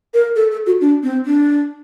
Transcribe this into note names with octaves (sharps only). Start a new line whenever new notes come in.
A#4
A4
A4
F#4
D4
C4
D4